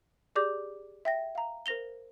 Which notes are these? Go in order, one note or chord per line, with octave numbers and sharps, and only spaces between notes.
G4 G#4 D5 D6 G6
E5 G5 A#6
F5 A#5
A#4 C5 A#6 F7 G7